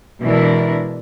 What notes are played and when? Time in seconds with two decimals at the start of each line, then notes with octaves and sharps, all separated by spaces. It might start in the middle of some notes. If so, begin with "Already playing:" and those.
0.22 B2 E3 G#3 D4 E4 A#4